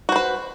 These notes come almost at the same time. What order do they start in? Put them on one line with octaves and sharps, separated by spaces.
F#4 C5 B4